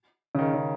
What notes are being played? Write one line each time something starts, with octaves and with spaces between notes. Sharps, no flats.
C#3
D#3
C#3